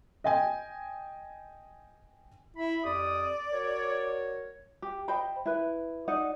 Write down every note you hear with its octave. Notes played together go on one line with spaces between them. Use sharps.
D#5 G5 G#5
E4 B5
F2 G4 D5 D#6
F#4 A#4 C#5
G4
C5 D#5 G5 B5
E4 B4
D#4 D5 D#5 F#5